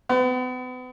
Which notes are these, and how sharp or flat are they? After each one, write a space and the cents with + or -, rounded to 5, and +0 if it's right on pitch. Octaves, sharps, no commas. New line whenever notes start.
B3 +40